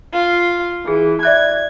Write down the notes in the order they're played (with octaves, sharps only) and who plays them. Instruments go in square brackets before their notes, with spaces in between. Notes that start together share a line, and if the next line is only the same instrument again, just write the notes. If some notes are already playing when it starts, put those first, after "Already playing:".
[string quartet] F4
[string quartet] E3 [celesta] G#4
[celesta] D5 E5 F#6 [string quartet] G#6